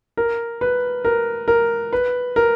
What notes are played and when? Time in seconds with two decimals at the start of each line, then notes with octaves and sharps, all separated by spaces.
0.17 A#4
0.61 B4
1.05 A#4
1.48 A#4
1.93 B4
2.36 A#4